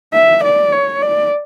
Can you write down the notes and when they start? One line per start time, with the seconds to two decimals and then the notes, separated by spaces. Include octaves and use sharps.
0.13 E5
0.44 D5
0.72 C#5
1.02 D5